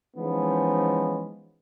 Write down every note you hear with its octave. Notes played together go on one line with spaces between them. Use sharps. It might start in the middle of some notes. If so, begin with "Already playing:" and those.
E3 F3 G#3 B3 C#4 D#4